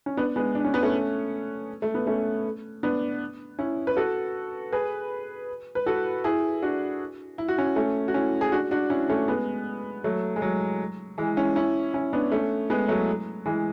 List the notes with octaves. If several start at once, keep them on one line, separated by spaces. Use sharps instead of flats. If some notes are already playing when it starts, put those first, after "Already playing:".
C#4
B3 D4
G#3 B3
D4
C#4
B3
A3 C#4
A3
B3
A3 C#4
B3 D4
C#4 E4
B4
F#4 A4
G#4 B4
B4
F#4 A4
E4 G#4
D4 F#4
E4
F#4
C#4 E4
A3 C#4
F#4
C#4 E4
G#4
D4 F#4
D4 F#4
C#4 E4
A3 C#4
G#3 B3
F#3 A3
G#3
F#3
E3 G#3
C#4 E4
C#4 E4
C#4 E4
B3 D4
A3 C#4
G#3 B3
F#3 A3
E3 G#3